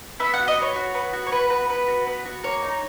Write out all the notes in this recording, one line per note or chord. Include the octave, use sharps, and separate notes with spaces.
B3 E5
F#5
F#4
D#5
B3 C#5
F#4
B3
F#4
C#5
B3 B4
F#4 B4
B3 B4
F#4
B3
F#4
A#3 C#5
D#4